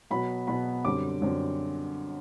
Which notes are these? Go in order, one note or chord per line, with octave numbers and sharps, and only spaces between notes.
B2 F#3 B3 B5
B2 F#3 B3 B5
F#2 D3 G3 C4 D6
F#2 D3 G3 C4